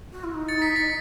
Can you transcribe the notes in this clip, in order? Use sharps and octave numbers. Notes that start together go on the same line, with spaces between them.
F#4
E4
D#4
A6 C#7
B6
A6 C#7
D#5